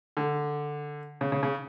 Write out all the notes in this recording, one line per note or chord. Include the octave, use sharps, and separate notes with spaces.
D3
C#3
C#3
C#3